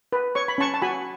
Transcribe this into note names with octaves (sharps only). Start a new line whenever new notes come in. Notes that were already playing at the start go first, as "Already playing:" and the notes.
B4
C#5 C#6
B5
C#4 A5 C#6
A5
F#4 G#5 B5